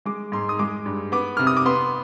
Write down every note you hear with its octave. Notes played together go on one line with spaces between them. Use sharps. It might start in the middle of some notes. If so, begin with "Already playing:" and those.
G#3 D6
G#2 C6
D#6
G#3 D6
G2
B3 D6
C3 F6
D#6
D6
B3 C6